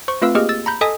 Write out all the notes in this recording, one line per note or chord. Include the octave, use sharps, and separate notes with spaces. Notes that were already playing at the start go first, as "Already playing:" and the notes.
C5 C#6
A3 C4 F4 B4 F5 E6
A#3 G4 G#4 D#5 F6
E6 A6
A#5 B5 G6
A4 D#5 G#5 D#6 B6